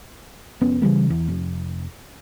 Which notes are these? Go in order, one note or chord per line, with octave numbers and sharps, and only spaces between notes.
F1 B3 C#4
C#3 E3 G3 A#3
E2
F1